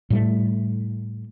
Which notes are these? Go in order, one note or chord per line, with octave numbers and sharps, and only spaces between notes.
A2 G3 A3